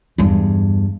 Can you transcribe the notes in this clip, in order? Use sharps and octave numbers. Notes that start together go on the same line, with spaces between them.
E2 G2